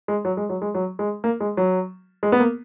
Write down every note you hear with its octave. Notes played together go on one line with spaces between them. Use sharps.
G#3
F#3
G#3
F#3
G#3
F#3
G#3
A#3
G#3
F#3
G#3
B3
A#3